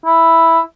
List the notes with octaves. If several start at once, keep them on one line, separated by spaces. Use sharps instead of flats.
E4